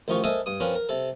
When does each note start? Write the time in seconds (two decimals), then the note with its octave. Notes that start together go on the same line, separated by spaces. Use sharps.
0.08 A1 D#3 F3 D#4 F4 C#6
0.24 A4 A#4 C5 D#5 E5 G#5
0.46 G2 D#6
0.60 F3 C4 C#4 A#4 B4
0.75 A#4
0.89 C3 A4